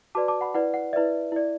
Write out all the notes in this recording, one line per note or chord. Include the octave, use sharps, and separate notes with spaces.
F#4 B4 D5 A5 D6
A5 D6
F#5 B5
E4 B4 D5 F#5
F#5
E4 B4 D5 E5
E4 D5